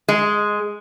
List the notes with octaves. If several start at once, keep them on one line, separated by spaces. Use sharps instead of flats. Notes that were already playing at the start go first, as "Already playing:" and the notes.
G#3